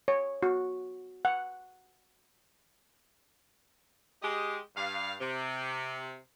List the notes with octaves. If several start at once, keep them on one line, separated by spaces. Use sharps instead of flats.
C#5
F#4
F#5
G#3 G4 D#5
G2 F5
C3